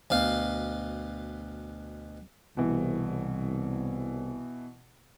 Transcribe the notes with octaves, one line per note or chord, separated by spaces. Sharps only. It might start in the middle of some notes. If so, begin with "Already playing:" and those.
D2 B2 F5
C2 B2 E3